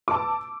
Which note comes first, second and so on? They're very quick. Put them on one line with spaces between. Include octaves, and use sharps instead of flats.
D6 A5 E6